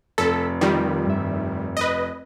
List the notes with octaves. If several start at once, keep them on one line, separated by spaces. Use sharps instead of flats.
F1 A4 B6
D#3 G3 F4 A#4 B5
G2 E5
B4 D#5